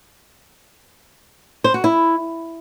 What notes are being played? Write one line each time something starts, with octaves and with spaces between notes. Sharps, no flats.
C5
F#4
E4